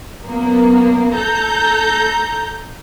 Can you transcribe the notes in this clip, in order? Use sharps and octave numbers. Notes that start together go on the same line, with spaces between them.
F#2 A#3 B3
A4 A#5 G6